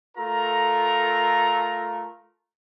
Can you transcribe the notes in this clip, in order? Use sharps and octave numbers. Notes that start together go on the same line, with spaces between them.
A3 F4 A4 A#4 A#5